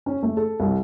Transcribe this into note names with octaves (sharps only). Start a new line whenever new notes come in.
C#4
A3
A4
C2